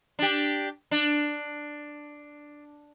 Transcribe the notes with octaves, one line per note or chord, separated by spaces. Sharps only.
D4 G4
D4